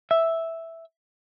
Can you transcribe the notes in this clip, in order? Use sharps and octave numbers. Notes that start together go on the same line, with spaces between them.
E5